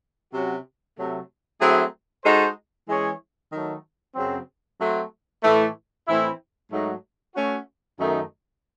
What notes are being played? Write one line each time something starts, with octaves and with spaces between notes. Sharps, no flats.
C3 F#3 C#4 F#4
C3 F#3 A3
F#3 A3 C4 E4 G#4
G#3 D#4 F#4 A4 C5
E3 G#3 C#4 G#4 C#5
D#3 F#3 A3
F#2 C#3 F#3 C4
F#3 A3 C4
A2 E3 A3
A2 E3 C4 E4
G#2 F#3 A3 D#4 F#4
A3 C#4 F#4
F#2 D#3 A3 D#4